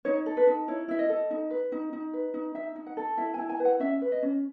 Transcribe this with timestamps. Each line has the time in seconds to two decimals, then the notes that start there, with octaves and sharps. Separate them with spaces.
0.05 D#4 C#5
0.26 A4
0.37 B4
0.47 D#4
0.68 E4 C#5
0.88 E4 E5
0.99 D#5
1.09 A4
1.31 D#4
1.51 B4
1.72 D#4
1.93 D#4
2.13 B4
2.34 D#4
2.55 D#4 E5
2.76 D#4
2.87 F#5
2.97 A4
3.18 E4 E5
3.34 G#5
3.38 E4
3.49 G#5
3.60 B4
3.65 F#5
3.80 C#4 E5
4.02 B4
4.12 D#5
4.23 C#4